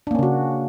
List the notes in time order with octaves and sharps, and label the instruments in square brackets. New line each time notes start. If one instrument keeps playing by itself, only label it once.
[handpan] D4
A#3
C#4
C#3
F#4